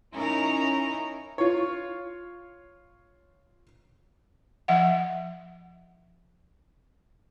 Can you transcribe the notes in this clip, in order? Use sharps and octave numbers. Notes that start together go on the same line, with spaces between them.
C#4 D#4 E4 A#4
F4 C#5
F3 E5 F#5